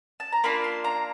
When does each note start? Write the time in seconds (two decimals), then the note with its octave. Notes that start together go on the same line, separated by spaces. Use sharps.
0.20 A5
0.32 A#5
0.44 A#3 D4 F4 B5
0.64 C6
0.84 A#5